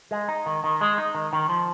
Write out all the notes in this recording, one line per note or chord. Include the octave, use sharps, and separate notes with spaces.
G#3
D#4
D#3
D#3
G#3
D#4
D#3
D#3
F3